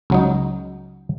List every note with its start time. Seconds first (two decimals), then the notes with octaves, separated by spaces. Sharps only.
0.10 C#2 F#3 D#4